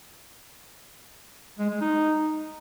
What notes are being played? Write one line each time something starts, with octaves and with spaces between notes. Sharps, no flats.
G#3
G#3
D#4